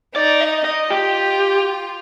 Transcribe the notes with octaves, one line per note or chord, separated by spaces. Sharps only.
D#4 D5
D#5
D#5
F4 G4